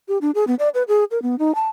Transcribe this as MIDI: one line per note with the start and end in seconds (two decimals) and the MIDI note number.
0.08 0.18 67
0.21 0.31 62
0.35 0.44 68
0.47 0.55 59
0.59 0.69 74
0.74 0.83 71
0.88 1.04 68
1.11 1.21 70
1.22 1.35 59
1.39 1.55 63
1.55 1.69 81